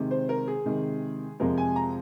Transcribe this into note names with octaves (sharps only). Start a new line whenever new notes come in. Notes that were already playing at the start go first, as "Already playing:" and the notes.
Already playing: C3 D#3 G#3
C5
A#4
G#4
C3 D#3 G#3
F2 C3 F3 G#3 A#4
G#5
A#5